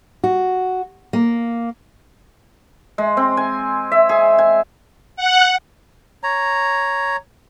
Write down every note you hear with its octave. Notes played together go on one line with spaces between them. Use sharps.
F#4
A#3
G#3
C4
G#5
E5
G#4
G#5
F#5
C#5 A#5